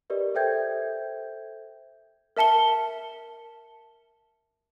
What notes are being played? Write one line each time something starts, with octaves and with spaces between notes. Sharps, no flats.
G4 A#4 B4 D5 D#5
A4 C5 E5 G5 G6 G#6
A#4 E5 A5 C#7 G7